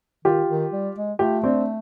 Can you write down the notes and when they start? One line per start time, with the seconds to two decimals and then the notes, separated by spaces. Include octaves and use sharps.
0.25 D#3 F4 G4
0.49 D#3
0.72 G3
0.96 G#3
1.19 A3 F4 G4
1.44 C4 D4